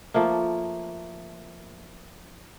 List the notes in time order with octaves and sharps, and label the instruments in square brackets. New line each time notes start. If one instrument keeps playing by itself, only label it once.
[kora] F3 A3 A#3